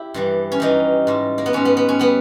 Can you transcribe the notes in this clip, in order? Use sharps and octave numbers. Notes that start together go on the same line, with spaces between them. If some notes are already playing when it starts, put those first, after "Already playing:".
Already playing: E4 G4
G2 E3 G3
C#4
G2 E3 G3 D#4
G#2 G3
A#3
B3
G#2 G3 C#4
B3
B3
C#4
G3 B3